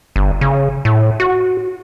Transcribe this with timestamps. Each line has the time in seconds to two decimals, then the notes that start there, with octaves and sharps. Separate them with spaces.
0.16 G1
0.41 C#3
0.85 A2
1.20 F#4